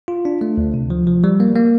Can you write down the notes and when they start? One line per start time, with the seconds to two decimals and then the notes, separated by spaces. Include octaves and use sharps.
0.08 F4
0.25 D4
0.41 A3
0.57 D2
0.74 C3
0.90 F3
1.07 F3
1.24 G3
1.40 A#3
1.55 A#3